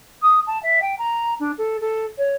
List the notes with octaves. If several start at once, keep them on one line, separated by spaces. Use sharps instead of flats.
D#6
A5
E5
G5
A#5
D4
A4
A4
C#5